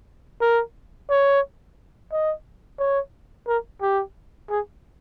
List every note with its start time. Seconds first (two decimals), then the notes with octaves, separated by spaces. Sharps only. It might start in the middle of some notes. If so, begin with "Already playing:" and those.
0.41 A#4
1.10 C#5
2.12 D#5
2.79 C#5
3.48 A#4
3.82 G4
4.50 G#4